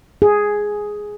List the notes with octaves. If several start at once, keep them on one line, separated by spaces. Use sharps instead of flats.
G#4